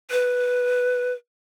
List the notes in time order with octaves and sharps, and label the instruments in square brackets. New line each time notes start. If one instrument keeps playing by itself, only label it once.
[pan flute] B4